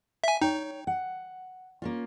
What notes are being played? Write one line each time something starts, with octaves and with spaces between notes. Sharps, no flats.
E5 G#5
D#4 C#5 G5
F#5
A#3 C#4 F4